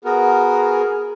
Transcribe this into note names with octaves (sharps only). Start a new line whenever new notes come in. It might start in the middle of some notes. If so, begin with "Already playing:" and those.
B3 F#4 G#4 A#4